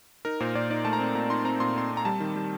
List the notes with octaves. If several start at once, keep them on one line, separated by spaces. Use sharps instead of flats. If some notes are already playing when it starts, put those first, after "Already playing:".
D#4 A#4
A#2 C5
A#2 D5
D#4 D5
A3 A5
A#5
C4
A#2 A#5
D#4 C6
C4 A#5
A#2 C6
C4 C6
C4
A#5
G3 A5
D#3
G3